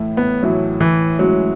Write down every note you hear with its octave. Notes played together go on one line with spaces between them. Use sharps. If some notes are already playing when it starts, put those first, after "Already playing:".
Already playing: A2 E3 A3
B3
A2 E3 F#3 A3
E3
A2 E3 F#3 G#3 C#4 E4